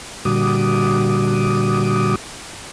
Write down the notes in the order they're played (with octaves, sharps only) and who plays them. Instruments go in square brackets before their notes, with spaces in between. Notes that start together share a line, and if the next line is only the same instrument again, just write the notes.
[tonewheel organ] A#2 D3 G3 F#4 D6 D#6